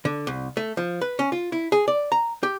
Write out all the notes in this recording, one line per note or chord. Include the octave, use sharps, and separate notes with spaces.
D3
C2
A3
F3
B4
C#4
F4
E4
G#4
D5
A#5
G4